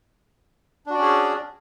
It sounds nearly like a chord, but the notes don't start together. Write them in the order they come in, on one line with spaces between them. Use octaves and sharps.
D4 F#4 D5 C#4 G#4